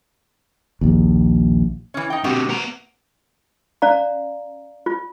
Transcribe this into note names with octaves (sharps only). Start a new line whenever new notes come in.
A#1 D#2
E3 C#4
D#4 G5
B2 D3 C4 F#4 G4
B3 A#5
C#4 D5 F5 A#5
F4